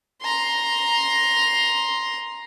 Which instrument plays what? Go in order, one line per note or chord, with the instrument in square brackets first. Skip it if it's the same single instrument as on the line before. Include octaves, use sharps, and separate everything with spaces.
[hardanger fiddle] A#5 C6